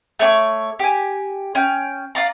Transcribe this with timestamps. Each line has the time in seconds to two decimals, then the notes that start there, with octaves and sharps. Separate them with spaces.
0.19 A3 C#5 G5 D6
0.79 G4 G#5
1.55 C#4 G5
2.15 F4 D5 A#5